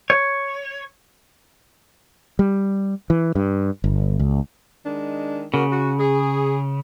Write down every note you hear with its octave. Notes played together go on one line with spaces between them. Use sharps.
C#5
G3
E3
G2
G1
C#2
D#3 G#3 D4
C#3 A#3 F#4
F#4
G#4